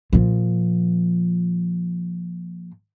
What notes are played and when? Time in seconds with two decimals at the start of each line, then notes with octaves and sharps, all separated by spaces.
0.13 A#2 F3